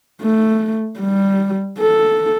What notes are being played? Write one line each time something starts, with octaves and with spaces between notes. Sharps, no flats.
A3
G3
A4